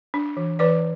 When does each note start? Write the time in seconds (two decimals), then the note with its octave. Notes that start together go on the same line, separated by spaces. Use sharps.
0.14 D4
0.37 E3
0.59 E3 B4 D5